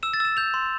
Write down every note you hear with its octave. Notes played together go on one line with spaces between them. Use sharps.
E6 E7
A6
E6 E7
G6 F7
C6